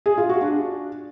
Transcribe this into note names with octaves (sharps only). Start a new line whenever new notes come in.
G#4
F4
F#4
D4